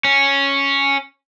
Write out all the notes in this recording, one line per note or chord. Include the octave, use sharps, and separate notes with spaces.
C#4